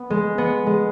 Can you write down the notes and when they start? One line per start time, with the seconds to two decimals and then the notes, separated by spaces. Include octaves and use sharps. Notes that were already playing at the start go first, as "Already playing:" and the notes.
Already playing: B3
0.10 G#3
0.38 B3
0.67 G#3